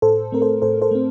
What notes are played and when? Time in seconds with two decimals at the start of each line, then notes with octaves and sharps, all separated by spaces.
0.02 A2 A4 C5
0.32 A3 C4 A#4
0.42 A4 C5
0.62 A2 A4 C5
0.82 A4 C5
0.91 A3 C4